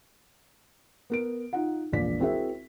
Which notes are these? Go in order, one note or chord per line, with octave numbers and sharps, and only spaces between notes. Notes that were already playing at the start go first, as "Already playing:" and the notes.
B3 A#4 D7
D#4 F4 F#5
E1 A#1 A#3 D5 B6
C4 E4 F#4 G#4 A#4 E5